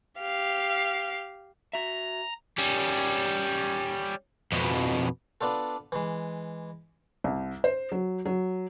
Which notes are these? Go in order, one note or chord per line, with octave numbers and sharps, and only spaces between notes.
G4 F5
F#4 E5 A#5
G3 C#4
F2 B2
B3 D4 F4 A4
E3 G#3
C2
C5
F#3
F#3